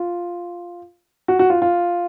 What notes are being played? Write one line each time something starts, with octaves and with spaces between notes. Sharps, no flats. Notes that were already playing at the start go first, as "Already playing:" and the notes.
Already playing: F4
F#4
F#4
F4
F4